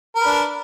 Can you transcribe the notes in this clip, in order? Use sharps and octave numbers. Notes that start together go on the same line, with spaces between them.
D4 A#4 B4